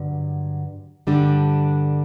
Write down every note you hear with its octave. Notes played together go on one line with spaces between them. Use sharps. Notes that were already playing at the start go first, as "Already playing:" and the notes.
Already playing: G2 D3 F#3
G2 D3 G3 D4